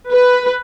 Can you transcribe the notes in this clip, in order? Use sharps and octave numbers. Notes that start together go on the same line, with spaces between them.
B4